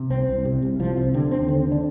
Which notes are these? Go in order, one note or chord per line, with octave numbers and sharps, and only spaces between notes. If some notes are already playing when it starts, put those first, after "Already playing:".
Already playing: C3
C2 C4
C2
C3
C2
C2 F3
C3
D3 C4
D#2 C4
D3 C4
C4
D3
D4